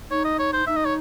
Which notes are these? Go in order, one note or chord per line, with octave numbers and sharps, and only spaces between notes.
D#4 C#5
D#5
C#5
C5
D#4 E5
D#5
C#5